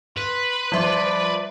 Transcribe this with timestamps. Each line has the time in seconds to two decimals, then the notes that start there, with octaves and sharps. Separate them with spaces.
0.17 B4 C6
0.72 F3 G3 D5 E5 C6